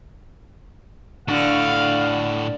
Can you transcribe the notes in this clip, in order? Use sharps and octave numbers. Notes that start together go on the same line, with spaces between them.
A2 D3 F#4 F5